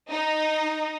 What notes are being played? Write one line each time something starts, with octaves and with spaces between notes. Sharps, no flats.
D#4